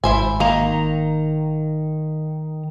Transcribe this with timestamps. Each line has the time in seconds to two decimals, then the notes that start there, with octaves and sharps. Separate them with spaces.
0.04 G#1 E4 C5 G#5
0.40 D#3 A#3 D#4 A#5